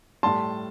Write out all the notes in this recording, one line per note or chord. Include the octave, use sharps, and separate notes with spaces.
A2 G3 A5 C6